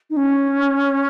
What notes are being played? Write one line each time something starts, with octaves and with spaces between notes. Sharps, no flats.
D#4
C#4